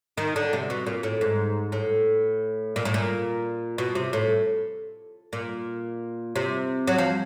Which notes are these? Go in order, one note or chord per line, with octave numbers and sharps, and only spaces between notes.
D#3
D3
C3
B2
A#2
A2
G#2
A2
A#2
A2
A#2
B2
C3
A2
A#2
C3
F#3
F3